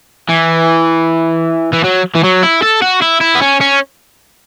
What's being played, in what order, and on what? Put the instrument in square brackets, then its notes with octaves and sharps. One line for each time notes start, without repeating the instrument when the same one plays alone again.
[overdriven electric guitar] E3
E3
F#3
E3
F#3
E4
A4
F#4
E4
E4
B3
C#4
C#4